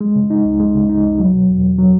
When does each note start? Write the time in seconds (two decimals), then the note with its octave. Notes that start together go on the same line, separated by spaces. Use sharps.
0.01 G#3
0.15 C#3
0.30 D#4
0.45 C#2
0.60 G#3
0.75 C#3
0.89 D#4
1.04 C#2
1.19 F#3
1.34 B2
1.49 E2
1.64 E2
1.78 F#3